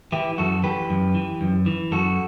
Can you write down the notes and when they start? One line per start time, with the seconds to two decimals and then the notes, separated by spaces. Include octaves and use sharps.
0.12 E3 E4 G4
0.38 F#2 F#4 A4
0.63 E3 G4 B4
0.90 F#2
1.14 E3
1.41 F#2
1.66 E3
1.91 F#2 F#4 A4